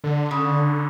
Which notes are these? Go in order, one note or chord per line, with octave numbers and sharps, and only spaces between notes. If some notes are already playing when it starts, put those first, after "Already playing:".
D3
C#3